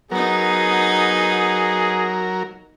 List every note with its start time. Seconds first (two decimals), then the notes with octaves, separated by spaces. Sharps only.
0.11 F#3 B3 D#4 G#4 A#4